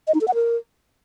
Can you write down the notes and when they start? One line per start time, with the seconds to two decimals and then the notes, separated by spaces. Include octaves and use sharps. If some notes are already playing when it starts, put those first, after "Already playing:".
0.08 D#5
0.14 D#4
0.21 A4
0.28 F#5
0.34 A#4